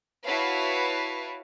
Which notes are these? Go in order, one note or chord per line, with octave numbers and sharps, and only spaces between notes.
E4 F#4 B4 C#5 F5 A5